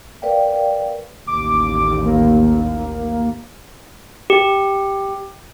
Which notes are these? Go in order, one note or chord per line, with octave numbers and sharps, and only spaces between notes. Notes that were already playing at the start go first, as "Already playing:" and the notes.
A#4 B4 D5 F5 G5
A1 D#2 D6
A#3
G4